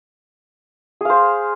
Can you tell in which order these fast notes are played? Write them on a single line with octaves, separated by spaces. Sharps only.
G#4 F5 C5